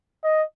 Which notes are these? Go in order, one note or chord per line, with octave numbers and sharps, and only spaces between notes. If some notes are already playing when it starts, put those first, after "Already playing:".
D#5